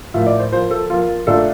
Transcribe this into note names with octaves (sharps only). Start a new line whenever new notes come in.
A2 F3 A#3 F4 E5
D5
C5
F3 A#3 F4 C5
A4
F3 A#3 F4
A#2 A3 D4 F4 A4